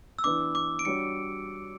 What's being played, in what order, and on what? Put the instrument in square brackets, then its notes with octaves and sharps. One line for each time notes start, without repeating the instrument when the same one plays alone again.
[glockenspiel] E6
[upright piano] E3 B3 D4 [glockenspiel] D6
[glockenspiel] D6
D7
[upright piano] G3 D4 F#4 C#5 [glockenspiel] C#7